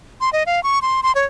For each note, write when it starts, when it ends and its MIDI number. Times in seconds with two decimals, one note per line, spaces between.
0.21 0.30 84
0.33 0.43 75
0.46 0.63 77
0.63 0.79 85
0.82 1.01 84
1.03 1.12 84
1.15 1.26 73